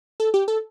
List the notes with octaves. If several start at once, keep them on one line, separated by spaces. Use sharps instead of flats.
A4
G4
A4